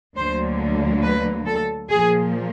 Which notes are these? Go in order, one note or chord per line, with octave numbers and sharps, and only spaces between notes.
D2 D3 F#3 A#3 C5
B4
A4
A#2 F3 A#3 G#4